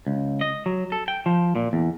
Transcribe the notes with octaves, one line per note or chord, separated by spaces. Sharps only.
C#2
D#5
F#3
A4
G5
F3
A#2
E2